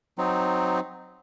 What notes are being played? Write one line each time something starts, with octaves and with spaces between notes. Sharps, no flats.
F#3 C4 D#4